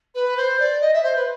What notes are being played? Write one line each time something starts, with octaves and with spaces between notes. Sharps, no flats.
B4
C5
D5
D#5
E5
C5
B4